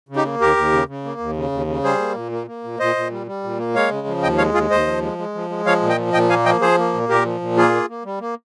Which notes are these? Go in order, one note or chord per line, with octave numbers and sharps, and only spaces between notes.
C#3
D#4 G4
A#3
D#2 G4 A#4
D#2
C#3
C#3
A#3
D#2
C#3
D#2
C#3
G3 G#4 C5
A#3
A#2
A#3
A#3
A#2
A#2 C5 D#5
A#2
G3
G3
A#2
A#3
G#3 C#5 F5
C#3
F3
D#2 D#5 G5
G#3 C#5 F5
D#2 F4 G#4
D#2 C5 D#5
F3
G#3
G#3
F3
G#3
F3 C#5 F5
A#2
D#5 G5
F3
A#2 D#5 G5
A#3 F5 G#5
F3 D#5 G5
F3 G#4 C5
A#3
A#2
A#2 G4 A#4
F3
A#2
A#3 F4 G#4
A#3
A#3
G3
A#3